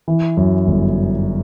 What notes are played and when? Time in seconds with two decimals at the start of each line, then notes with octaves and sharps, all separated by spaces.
0.08 E3
0.37 F#2
0.67 G1